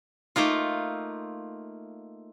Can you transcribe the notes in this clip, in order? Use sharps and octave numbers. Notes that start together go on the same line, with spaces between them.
A3 A#3 D#4 F4